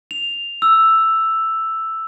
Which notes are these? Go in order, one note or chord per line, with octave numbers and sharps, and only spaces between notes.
F7
E6